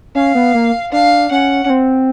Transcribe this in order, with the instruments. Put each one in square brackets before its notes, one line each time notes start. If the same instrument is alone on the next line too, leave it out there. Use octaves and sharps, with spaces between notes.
[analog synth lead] C#4 [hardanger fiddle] F5
[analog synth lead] B3
A#3
[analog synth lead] D4 [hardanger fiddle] F5
[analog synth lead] C#4 [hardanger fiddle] F#5
[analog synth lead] C#4
C4